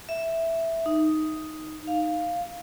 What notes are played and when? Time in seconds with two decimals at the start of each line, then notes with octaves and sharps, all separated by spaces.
0.09 E5
0.86 D#4
1.87 F5